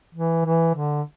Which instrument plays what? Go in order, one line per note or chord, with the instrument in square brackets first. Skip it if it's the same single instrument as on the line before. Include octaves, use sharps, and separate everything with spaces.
[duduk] E3
E3
D3